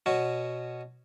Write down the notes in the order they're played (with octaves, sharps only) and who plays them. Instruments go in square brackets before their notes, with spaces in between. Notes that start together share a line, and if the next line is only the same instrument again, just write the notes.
[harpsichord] B2 C#4 F#4